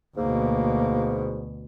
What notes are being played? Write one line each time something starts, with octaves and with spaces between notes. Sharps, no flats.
D2 G#2 B2 A#3